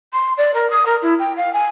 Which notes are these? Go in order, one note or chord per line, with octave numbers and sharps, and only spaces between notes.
C6
D5
A#4
D#6
A#4
E4
G5
F5
G#5